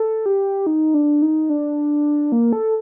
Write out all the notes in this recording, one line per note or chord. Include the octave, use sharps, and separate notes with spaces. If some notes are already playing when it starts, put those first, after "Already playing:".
Already playing: A4
G4
D#4
D4
D#4
D4
A#3
A4